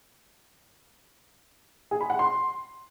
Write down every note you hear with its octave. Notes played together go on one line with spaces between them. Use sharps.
G#4
B5
F#5
C6